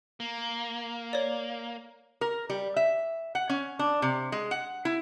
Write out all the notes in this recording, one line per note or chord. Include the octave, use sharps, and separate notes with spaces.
A#3
C#5 D5
A#4
G3
E5
F#5
C#4
D4
C3
G#3
F#5
E4